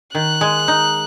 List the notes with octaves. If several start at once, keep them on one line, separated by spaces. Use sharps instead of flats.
D#3 F#6
G#3
D#4